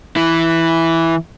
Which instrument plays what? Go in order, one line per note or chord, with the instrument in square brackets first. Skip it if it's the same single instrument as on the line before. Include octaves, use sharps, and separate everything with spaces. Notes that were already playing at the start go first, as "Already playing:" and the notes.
[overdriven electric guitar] E3 E4